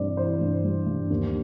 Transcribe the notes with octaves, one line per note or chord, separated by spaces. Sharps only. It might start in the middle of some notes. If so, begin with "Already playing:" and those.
Already playing: G2 E3 G3 C4 D5
E3 C5
G2
G3
G2
D#2